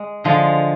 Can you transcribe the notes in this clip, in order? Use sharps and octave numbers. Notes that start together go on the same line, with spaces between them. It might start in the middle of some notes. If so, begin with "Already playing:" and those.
Already playing: G#3
D3 F3 G#3